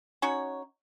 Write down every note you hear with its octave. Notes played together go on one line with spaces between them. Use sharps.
C#4 D#4 F#4 C#5